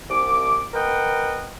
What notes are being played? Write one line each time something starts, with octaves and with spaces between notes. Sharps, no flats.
C2 D6
A#4 B4 D#5 F#5 G5